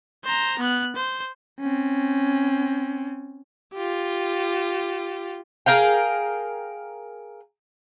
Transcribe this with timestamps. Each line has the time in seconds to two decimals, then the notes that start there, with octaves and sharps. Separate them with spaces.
0.24 C5 A#5
0.59 B3 F#6
0.95 C5
1.60 C4 C#4
3.74 F4 G4
5.66 G#4 A#4 F5 G5